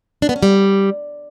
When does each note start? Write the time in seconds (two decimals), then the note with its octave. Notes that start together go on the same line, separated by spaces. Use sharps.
0.22 D4
0.29 B3
0.36 C#4
0.43 G3